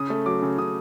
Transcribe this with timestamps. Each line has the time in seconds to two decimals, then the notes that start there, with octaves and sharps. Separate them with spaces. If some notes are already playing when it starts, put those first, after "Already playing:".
Already playing: C#3 D#6
0.10 A3
0.26 F#3 D6
0.42 C#3
0.58 C#3 D#6